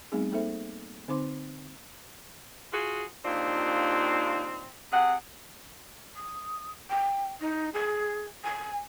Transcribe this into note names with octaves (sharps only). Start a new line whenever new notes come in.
G3 A3 B3 C4 D#4 G#4
A#3 D#4 A4 C5 E5
D3 C4 D#4 C5 C6 D6
F4 F#4 G#4
D#2 C4 D4 F4
C3 G#4 F#5
D#6
G5
D#4
G#4
G#5